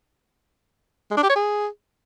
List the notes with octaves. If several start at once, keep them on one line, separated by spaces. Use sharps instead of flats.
G#3
D4
G4
C#5
G#4